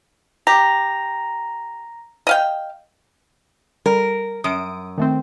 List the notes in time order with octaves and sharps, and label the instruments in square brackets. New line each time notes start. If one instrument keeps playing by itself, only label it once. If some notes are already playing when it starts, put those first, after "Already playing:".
[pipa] G4 [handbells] A#5 A#6
[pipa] D#5 F5 G5
[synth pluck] G3 [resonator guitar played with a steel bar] A#4
[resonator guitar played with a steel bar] F#2 [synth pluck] D#6 D7
[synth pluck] D#3 A3 C4